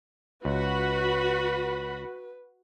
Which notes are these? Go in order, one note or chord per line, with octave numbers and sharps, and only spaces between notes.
C#2 F#4 B4 B5